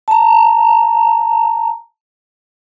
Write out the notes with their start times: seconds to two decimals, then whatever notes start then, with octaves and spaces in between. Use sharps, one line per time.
0.08 A5 A#5